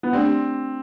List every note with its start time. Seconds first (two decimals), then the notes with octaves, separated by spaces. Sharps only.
0.03 B3
0.13 A3 C4 D4 G4 D5